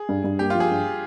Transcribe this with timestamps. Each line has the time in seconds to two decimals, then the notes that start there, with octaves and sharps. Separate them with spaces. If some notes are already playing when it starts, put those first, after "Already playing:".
Already playing: G#4
0.09 G2
0.24 G2
0.39 A#3 G4
0.50 F3 F4
0.60 G#4
0.70 G2